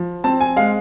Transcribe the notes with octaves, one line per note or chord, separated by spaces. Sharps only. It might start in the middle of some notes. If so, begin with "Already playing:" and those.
Already playing: F3
C4 A5
G#5
G#3 F5